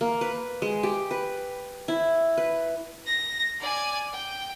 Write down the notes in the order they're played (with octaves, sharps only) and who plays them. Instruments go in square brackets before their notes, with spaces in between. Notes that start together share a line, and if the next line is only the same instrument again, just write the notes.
[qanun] A#3
B4
G#3
G4
B4
E4
B4
[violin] A#6
D5 G#5
G5